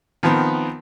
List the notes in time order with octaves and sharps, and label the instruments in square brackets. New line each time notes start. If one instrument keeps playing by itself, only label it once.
[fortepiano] D#3 F3 B3 C4